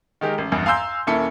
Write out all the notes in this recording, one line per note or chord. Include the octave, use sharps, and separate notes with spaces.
D#3 G#3 G4 A#4
A1
A#1 E2 G2
F5 G#5 A#5 C6 E6 G6
D#1 A#3 C#4 E4 A4 C#7